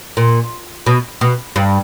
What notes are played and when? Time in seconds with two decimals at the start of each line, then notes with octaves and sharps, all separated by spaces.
0.17 A#2
0.86 B2
1.21 B2
1.56 G2